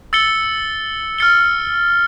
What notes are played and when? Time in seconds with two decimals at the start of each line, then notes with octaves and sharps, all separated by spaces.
0.13 E6 A6 C#7 G7
1.18 F6 A6 C#7 G7